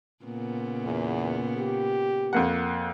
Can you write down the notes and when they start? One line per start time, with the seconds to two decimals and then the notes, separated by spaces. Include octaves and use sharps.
0.24 A#2 C#3 B3
0.84 E2
1.57 G4
2.33 F2 A#3 F#5